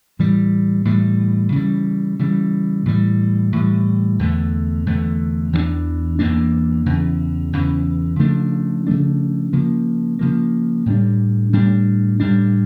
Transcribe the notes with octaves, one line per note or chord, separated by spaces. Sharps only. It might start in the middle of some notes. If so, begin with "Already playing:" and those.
A2 E3 G3
A2 E3 G3
C#3 E3 G3
C#3 E3 G3
A2 E3 G3
A2 E3 G3
E2 D3 A3
E2 D3 A3
E2 E3 A#3 D4
E2 E3 A#3 D4
E2 C#3 E3
E2 C#3 E3
C#3 F3 A3 D4
C#3 F3 A3 D4
C#3 F3 A#3
C#3 F3 A#3
A2 G3 D4
A2 G3 D4
A2 G3 D4